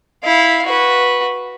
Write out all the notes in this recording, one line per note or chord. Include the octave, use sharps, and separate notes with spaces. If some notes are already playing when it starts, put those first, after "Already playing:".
E4 F5
F#4 B4